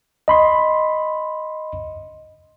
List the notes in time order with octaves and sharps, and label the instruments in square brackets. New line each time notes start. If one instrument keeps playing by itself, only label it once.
[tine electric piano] D#5 B5 C6